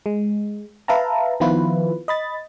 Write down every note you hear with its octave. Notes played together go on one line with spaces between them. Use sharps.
G#3
B4 E5 F5 A5 A#5
D#3 F3 B3 E4 F4 B4
D#5 B5 A6